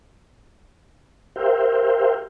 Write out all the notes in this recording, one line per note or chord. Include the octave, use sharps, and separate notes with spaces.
G4 A#4 C5 E5 F5 G5